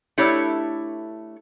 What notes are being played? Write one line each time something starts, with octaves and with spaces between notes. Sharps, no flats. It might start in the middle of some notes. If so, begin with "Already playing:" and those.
A3 D4 E4 G4 C#5 A5